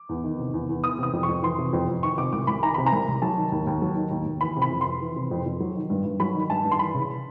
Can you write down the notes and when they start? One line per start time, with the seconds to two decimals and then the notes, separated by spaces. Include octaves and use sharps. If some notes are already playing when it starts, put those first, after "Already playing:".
Already playing: D6
0.09 E2
0.24 D#3
0.39 C3
0.54 E2
0.69 E2
0.84 E3 D#6
0.98 C3 D#6
1.13 F2
1.23 C#6
1.28 F2
1.43 E3 C6
1.59 C3
1.73 F2
1.88 F2
2.03 D#3 C#6
2.17 C3 D6
2.33 C2 D6
2.47 C2 B5
2.63 D#3 A#5
2.74 C3 B5
2.86 A#5
2.92 C2
3.07 C2
3.22 F#3 A5
3.37 D#3
3.52 D#2
3.67 D#2
3.82 F#3
3.96 D#3
4.11 D#2
4.26 D#2
4.41 E3 B5
4.56 C3
4.62 B5
4.70 F2
4.81 C6
4.86 F2
5.01 E3
5.16 C3
5.31 F2
5.46 F2
5.60 F#3
5.76 D#3
5.90 G2
6.06 G2
6.20 F#3 B5
6.34 D#3
6.50 G2 A5
6.64 G2
6.71 C6
6.79 E3 B5
6.94 C#3